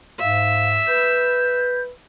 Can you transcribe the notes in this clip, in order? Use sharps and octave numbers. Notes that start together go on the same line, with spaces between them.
G#2 E5 F5
B4 G6